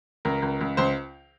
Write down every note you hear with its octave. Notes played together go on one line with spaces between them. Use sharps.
C#2 A#4
C#2
C#2
C#2 C5